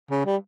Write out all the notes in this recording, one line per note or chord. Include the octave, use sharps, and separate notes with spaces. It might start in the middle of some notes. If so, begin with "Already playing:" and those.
C#3
G3